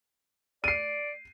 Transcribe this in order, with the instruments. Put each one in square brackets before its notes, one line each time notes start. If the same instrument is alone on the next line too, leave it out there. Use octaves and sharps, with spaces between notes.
[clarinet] D5 [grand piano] C7 D#7